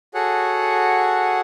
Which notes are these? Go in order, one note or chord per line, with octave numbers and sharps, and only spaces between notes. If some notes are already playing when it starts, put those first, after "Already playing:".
F#4 G#4 A4 C#5 F#5